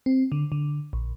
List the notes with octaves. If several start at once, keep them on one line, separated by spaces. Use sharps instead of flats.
C4
D3
D3
A#1